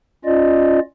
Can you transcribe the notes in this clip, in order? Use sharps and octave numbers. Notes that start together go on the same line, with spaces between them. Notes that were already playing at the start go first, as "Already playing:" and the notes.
C#4 F4 D5 D#5